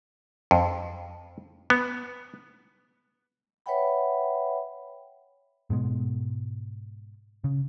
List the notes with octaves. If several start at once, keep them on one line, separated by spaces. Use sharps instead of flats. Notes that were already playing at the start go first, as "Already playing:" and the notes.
F2
B3
B4 C#5 E5 F#5 G5 B5
G#2 B2 G#3
C#3